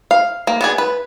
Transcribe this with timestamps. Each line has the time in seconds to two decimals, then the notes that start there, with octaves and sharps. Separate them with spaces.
0.11 F5
0.47 A#3
0.61 B3 D4 G#4
0.78 B4